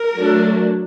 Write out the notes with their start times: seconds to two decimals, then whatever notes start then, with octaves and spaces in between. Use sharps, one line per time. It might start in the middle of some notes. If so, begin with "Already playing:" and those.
Already playing: A#4
0.16 F#3 A3 D4